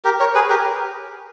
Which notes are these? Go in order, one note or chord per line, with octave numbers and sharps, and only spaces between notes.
G4 A#4
A#4 C#5
G#4 B4
G4 A#4